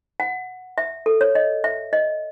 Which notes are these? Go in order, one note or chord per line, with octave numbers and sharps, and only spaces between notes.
F#5
E5
A4
C#5
D#5
E5
D#5